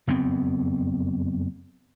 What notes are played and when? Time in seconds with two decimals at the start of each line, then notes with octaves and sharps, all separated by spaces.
0.07 F#1 F2 B3 C4